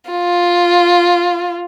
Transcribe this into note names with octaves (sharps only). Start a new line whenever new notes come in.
F4